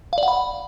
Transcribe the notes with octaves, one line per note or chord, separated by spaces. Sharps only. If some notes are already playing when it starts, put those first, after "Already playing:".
F5
D5
F#5
B5
F#5